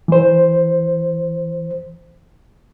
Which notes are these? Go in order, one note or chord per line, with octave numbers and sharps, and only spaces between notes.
E3 C5